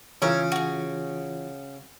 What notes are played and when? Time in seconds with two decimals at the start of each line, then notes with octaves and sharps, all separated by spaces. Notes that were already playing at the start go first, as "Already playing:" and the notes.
0.22 C#3 E3 F4 A#4 C#5 E5
0.52 F#4 G#4